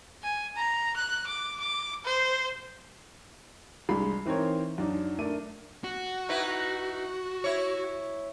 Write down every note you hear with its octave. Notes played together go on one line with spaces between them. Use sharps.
G#5
A#5
F#6
D6
D6
C5
C2 G#3 D4 B5 C7
E3 C4 D#4 A#4 C#5
F#2 D4 D#4
A3 D4 A#4 D#7
F#4
D#4 E4 B4
E4 C#5